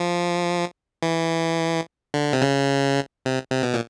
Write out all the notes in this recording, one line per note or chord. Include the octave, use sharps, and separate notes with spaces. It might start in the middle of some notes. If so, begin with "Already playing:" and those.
Already playing: F3
E3
D3
C3
C#3
C3
C3
B2
A#2